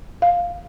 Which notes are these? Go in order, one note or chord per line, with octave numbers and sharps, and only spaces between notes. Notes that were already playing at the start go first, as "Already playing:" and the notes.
F5